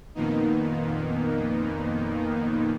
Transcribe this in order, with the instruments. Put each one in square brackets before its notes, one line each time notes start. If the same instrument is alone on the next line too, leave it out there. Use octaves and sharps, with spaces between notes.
[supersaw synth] F2 A#2 D#3 A#3 B3 D#4